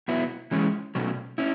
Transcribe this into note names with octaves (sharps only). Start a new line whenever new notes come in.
B2 F#3 B3 E4
E3 G#3 C#4
B2 F#3 A3 C#4
C#4 E4